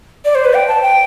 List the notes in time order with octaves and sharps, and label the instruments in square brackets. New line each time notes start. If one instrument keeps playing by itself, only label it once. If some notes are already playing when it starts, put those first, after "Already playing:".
[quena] D5
C5
B4
G5
A5
G5